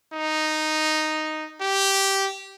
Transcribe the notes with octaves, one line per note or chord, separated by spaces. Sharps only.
D#4
G4